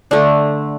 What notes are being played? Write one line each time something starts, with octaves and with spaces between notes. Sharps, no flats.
D3 A3 D4